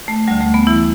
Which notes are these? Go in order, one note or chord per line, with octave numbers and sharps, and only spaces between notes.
A3
D2 D3 G3
A3
B3
E3 E4